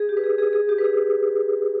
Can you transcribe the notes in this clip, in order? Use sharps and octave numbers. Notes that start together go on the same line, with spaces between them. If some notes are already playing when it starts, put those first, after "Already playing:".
Already playing: G#4
G4
B4
G#4
G#4
G#4
G4
B4
G#4